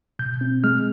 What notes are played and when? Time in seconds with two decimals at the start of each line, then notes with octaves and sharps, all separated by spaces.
0.19 B2 G6
0.41 C4
0.64 G#3 F6